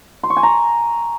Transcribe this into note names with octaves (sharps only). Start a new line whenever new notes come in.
C6
C#6
G#5
A#5